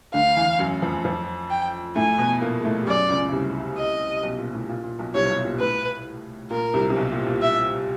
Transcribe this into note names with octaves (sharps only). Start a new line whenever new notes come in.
D2 D3 F5
E2 E3
F#2 F#3
F2 F3
F2 F3
G5
A2 A3 G#5
B2 B3
A#2 A#3
G#3
A2 A3
G3
F#2 F#3 D5
C#2 C#3
C#3
C2 C3
D#5
B1 B2
A#2
A2
A#2
A#2
B1 B2
C2 C3 C#5
B1 B2
A#2
A2 B4
A#2 A#4
C2 C3
C3
B1 B2
A#2
A#2
E5